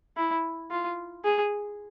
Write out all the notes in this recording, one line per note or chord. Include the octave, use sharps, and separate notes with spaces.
E4
F4
G#4